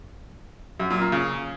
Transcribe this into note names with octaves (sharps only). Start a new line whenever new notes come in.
F#2
A#2
A#3
C#3